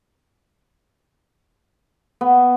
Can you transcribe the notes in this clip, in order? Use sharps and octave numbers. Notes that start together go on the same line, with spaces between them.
B3